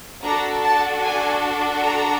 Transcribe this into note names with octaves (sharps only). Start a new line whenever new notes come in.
D4 F#4 A4 A#5
A5
G#5
A#5